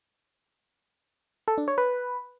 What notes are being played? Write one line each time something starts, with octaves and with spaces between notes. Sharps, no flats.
A4
D4
C#5
B4